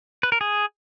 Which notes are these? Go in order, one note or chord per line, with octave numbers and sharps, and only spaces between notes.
B4
A#4
G#4